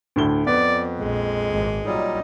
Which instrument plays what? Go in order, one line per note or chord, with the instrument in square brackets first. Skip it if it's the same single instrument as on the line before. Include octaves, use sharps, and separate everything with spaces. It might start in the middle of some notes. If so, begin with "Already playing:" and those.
[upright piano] D2 A2 G7
[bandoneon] F2 [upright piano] B3 [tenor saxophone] D5
[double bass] A#1 [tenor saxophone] G#3
[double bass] G#1
[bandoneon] A#2 F#3 G3 [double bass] D#4